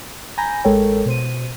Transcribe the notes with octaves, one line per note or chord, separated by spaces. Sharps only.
G#5 A#5 B5 G6 A#6
A1 G#3 A4 A#4 C#5 G5
B2 C5 D#7